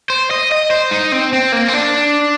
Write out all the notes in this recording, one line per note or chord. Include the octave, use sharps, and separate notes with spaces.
C5
D#5
D#5
C5
D#4
C4
C4
A#3
C4
D4